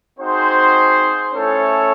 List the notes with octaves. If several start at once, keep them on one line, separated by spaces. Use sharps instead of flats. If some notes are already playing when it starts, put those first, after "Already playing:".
C4 D#4 F#4 G#4 C5
A3 C#4 E4 A4 C#5